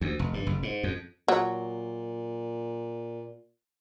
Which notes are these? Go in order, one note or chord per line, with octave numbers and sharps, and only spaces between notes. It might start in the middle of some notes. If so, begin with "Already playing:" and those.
D2
F1
G2
F#1
G#2
F2
A#2 F#3